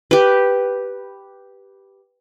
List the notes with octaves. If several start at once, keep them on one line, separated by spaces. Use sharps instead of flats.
G4 B4